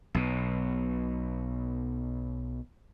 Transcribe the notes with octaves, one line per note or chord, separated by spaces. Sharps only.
B1 B2